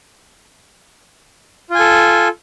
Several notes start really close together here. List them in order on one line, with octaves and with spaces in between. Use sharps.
F4 G#5 A4